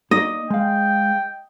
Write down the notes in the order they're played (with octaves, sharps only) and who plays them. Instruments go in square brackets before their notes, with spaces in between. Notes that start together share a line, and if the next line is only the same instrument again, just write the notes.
[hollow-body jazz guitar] A#3 D#4 D5 [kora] D#5
[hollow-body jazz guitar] G#3 F5 [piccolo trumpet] G5